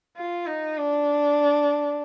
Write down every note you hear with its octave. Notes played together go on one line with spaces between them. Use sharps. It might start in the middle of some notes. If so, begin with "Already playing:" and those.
F4
D#4
D4